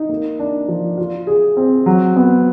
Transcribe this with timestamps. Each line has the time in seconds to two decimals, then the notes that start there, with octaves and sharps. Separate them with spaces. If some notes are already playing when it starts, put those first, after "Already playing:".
Already playing: D#4
0.09 A#3
0.39 D4
0.68 F3
0.97 F4
1.27 G#4
1.57 C4
1.86 F#3
2.16 B3